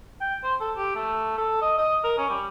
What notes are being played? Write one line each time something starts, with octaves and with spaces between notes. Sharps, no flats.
G5
C5
A4
G4
A3
A4
D#5
D#5
A#4
C#4
G3